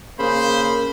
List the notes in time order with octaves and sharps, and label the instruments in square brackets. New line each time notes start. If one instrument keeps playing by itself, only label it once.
[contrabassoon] C#3 [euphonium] A#3 [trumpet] C5 [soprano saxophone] B5